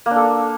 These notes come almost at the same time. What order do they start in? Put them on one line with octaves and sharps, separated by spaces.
A#3 D4 A4